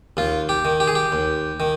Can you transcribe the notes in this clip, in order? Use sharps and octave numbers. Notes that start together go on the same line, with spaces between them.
D#2 F4
G4
D#3
G4
G#4
G4
D#2
D#3